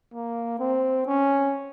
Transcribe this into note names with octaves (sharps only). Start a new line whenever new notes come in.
A#3
C4
C#4